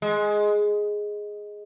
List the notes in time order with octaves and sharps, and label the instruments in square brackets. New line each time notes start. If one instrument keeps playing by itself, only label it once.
[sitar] G#3